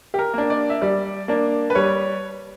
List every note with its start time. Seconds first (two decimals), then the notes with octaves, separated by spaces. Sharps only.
0.14 G4
0.19 A#4
0.34 A#3 D4
0.50 D5
0.69 E5
0.82 G3 D5
1.28 A#3 D4
1.70 B4
1.75 G3 C#5